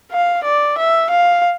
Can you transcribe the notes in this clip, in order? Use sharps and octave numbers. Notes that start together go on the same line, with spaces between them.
F5
D5
E5
F5